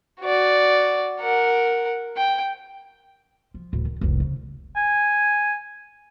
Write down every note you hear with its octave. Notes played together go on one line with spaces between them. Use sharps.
F#4 D5
A#4 F#5
G5
F3
D1 A2
D#3
F1 C2
C#3
G#5